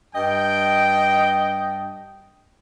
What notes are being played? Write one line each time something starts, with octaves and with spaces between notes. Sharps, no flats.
G2 D#5 G5